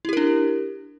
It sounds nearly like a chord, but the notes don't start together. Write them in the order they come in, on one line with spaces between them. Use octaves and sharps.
E4 G4 A#4 D4